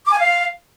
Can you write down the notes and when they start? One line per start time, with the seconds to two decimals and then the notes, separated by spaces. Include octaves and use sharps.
0.05 D6
0.11 G#5
0.17 F5